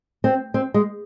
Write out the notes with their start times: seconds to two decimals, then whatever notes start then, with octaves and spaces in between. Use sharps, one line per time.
0.24 C4
0.54 C4
0.74 G#3